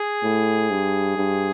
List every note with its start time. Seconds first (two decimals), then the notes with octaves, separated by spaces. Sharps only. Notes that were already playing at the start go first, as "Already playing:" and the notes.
Already playing: G#4
0.23 A2
0.70 G2
1.17 G2